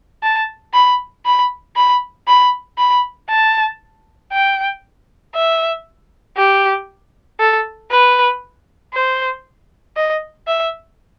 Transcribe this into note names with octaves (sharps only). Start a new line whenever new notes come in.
A5
B5
B5
B5
B5
B5
A5
G5
E5
G4
A4
B4
C5
D#5
E5